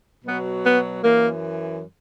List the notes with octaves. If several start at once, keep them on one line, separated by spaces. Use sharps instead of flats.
B2 F#3 B3
B3
F#2 E3 A#3